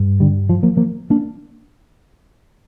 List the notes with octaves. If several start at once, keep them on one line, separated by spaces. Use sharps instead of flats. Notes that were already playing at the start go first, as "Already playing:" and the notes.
Already playing: G2
D3 G3
F3
F3 A#3
F3 A#3
A#3 D4